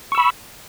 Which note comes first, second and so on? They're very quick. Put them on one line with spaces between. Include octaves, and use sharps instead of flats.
C#6 E6 B5